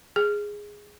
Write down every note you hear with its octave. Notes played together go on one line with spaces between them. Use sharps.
G#4